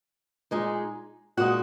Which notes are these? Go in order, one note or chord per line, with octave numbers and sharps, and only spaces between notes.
A#2 G#3 D#4
A#2 G#3 D#4 F#4 F#5